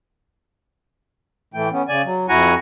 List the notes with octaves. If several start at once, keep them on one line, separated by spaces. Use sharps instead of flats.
A2 E3 A3 G5
B3 C#4
C#3 D5 G#5
F#3
F2 E4 F#4 F#5 G#5 A#5